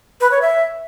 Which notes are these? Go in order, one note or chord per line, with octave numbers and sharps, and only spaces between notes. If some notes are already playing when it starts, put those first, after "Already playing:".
B4
C#5
E5